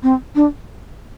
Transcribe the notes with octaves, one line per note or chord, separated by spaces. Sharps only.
C4
D4